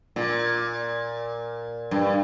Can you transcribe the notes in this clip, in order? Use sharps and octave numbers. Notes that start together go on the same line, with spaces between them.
A#2
G2